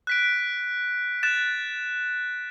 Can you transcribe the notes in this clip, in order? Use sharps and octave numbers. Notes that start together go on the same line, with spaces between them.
F#6 B6 D7
F#6 A6 E7